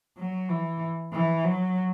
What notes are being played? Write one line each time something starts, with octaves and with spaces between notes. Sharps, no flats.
F#3
E3
E3
F#3